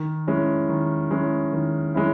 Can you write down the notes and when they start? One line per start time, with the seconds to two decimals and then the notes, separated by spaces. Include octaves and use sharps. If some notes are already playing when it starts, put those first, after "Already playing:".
Already playing: D#3
0.27 G#3 C#4 E4
0.69 D#3
1.11 G#3 C#4 E4
1.53 D#3
1.95 G#3 C#4 E4